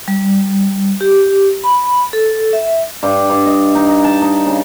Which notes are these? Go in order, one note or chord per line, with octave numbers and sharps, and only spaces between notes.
G3
G4
B5
A4
E5
G2
G2
D#5
D#4
A5
D#4
C#3